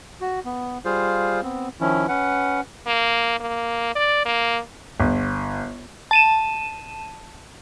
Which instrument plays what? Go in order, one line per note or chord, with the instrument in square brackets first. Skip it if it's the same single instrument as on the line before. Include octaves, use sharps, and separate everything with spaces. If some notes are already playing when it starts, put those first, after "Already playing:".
[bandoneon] F#4
B3
G3 F4 G#4 C5 F5
B3 C4
D#3 F3 C#4 E4
C#4 B4 F#5
[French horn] A#3
A#3
D5
A#3
[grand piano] G1
[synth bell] A5 D#7 E7